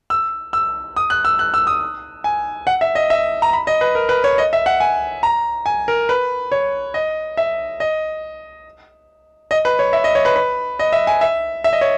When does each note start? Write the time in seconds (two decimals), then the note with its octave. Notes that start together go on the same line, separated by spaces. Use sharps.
0.10 E6
0.53 E6
0.96 D#6
1.10 F#6
1.25 E6
1.39 F#6
1.54 E6
1.67 D#6
2.24 G#5
2.67 F#5
2.81 E5
2.95 D#5
3.10 E5
3.42 A#5
3.53 B5
3.67 D#5
3.81 B4
3.95 A#4
4.09 B4
4.24 C#5
4.38 D#5
4.53 E5
4.66 F#5
4.80 G#5
5.23 A#5
5.66 G#5
5.88 A#4
6.09 B4
6.52 C#5
6.94 D#5
7.37 E5
7.80 D#5
9.51 D#5
9.65 B4
9.79 C#5
9.93 E5
10.04 D#5
10.15 C#5
10.25 B4
10.36 B4
10.79 D#5
10.92 E5
11.07 G#5
11.21 E5
11.64 E5
11.73 D#5
11.81 C#5